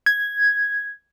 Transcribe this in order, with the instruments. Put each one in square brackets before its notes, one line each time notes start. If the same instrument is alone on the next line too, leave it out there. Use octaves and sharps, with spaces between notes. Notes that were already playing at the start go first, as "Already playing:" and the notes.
[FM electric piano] G#6